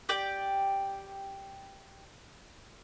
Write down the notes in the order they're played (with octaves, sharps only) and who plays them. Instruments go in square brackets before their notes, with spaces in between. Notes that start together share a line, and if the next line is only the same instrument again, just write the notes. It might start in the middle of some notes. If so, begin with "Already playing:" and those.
[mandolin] G4 D5 G5